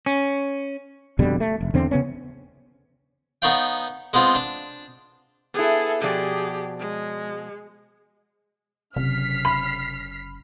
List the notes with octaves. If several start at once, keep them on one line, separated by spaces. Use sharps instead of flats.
C#4
F2 B2 D3 G3
A3
F1
E2 D3 C4
C#3 B3 C#4
B3 D#4 C#5 D5 F5 G5
G#3 B3 C4 F4
D4
B3 E4 G#4 A4
B2 F3 G4 G#4 D5
G#3
F#1 C3 F6 B6 C7
B5